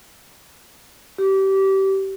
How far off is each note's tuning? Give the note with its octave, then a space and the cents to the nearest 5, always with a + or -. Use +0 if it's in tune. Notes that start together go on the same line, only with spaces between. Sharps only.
G4 -25